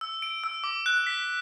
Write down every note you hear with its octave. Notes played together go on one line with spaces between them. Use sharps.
E6
D7
E6
D6
F#6
B6